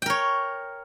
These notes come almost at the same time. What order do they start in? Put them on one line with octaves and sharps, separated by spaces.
G5 A#4 C#5